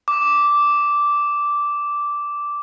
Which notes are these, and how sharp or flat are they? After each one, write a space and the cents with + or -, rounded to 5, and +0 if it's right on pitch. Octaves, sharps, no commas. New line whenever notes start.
D6 -5